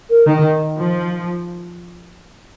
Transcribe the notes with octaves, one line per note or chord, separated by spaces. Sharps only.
A#4
D#3
F3